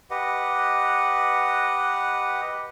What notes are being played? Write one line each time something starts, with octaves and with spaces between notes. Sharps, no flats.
G4 B4 D#5 F#5